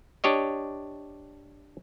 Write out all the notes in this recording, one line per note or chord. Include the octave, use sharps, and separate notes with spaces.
D4 G4 C#5 D#5